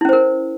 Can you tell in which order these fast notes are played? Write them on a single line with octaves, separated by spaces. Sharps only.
E4 C#4 C5 A#4